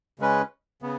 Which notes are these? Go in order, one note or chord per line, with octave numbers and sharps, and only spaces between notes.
C#3 G#3 C#4 B4
C#3 B3